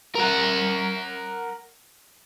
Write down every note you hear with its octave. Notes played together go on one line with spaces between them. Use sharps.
A#4 F#5